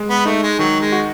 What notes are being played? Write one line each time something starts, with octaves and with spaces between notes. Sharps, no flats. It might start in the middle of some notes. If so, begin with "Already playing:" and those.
Already playing: G#3
B3
A3 D#4
G#3
D#3 F#3
G#3
F#4